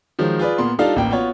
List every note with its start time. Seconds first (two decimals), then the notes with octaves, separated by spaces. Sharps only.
0.19 D#3 F3 F#3 G#3
0.39 F4 G#4 B4 D5
0.58 A#2 A#3 B3 C6
0.79 G3 D4 D#4 F4 A4 F5
0.96 A1 A#3 G5
1.11 B3 F4 F#4 C#5